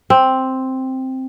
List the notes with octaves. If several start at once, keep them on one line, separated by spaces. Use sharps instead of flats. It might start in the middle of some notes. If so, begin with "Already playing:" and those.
C4